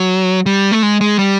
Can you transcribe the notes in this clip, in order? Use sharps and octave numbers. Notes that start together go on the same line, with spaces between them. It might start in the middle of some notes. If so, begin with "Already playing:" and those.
Already playing: F#3
G3
A3
G#3
G#3
G3